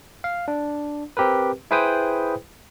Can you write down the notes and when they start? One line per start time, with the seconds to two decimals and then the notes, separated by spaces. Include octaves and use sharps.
0.24 F5
0.48 D4
1.17 C4 G4 A#4 B4
1.71 E4 G#4 B4 C5 G5 D#6